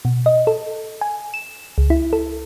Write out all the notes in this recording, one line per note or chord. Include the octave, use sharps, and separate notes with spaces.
B2
D#5
A4
G#5
E7
C#2
E4
A4